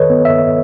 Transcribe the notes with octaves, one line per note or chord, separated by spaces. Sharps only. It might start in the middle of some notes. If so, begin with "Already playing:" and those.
Already playing: D#3 A4 B4 C#5 D#5
B3
E5